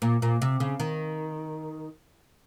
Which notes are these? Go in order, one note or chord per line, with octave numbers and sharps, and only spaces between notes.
A#2
A#2
C3
C#3
D#3